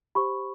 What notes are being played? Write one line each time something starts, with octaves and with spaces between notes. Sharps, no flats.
G4 C5 B5 C#6